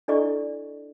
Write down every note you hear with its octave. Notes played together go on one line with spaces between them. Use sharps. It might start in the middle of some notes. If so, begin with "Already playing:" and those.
D4 E4 A4 D5 D#5 C#6